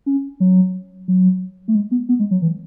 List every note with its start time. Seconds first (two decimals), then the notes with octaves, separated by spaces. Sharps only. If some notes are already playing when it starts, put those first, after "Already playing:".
0.06 C#4
0.40 F#3
1.08 F#3
1.68 A3
1.75 G#3
1.91 B3
2.09 B3
2.19 G#3
2.31 F#3
2.42 E3